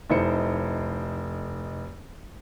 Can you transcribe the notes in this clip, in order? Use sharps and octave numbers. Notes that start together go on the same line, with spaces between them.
F1 D#4 E4 A4 C5 C#7